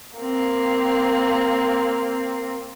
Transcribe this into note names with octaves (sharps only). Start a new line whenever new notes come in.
A#3 C4